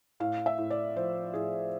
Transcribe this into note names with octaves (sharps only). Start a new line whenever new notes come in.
A2 F5
E5
A2
D5
F3 C5
A2 G#4